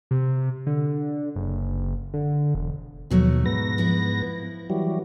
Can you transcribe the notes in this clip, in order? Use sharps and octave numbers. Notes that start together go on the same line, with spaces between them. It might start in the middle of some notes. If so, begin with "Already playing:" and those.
C3
D3
F#1
D3
E1
D#2 B2 F3 F#3 A3
G#2 B3 A#6
F3 E4
E3 F#3 G3